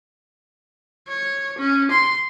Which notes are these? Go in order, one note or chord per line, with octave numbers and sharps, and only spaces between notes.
C#5
C#4
C6